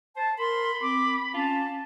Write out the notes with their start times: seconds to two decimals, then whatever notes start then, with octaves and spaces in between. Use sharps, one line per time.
0.17 C5 A5
0.39 A#4 B5 C6
0.82 C4 D6
1.34 C#4 F4 A5